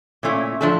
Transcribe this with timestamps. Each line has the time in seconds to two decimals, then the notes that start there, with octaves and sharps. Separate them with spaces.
0.23 A#2 A3 C#4 E4
0.61 A2 F3 A3 D4 A4